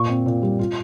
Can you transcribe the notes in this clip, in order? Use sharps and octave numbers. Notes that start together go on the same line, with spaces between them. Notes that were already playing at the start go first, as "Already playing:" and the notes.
Already playing: A#2 C#6
C4
A#2
G3
F4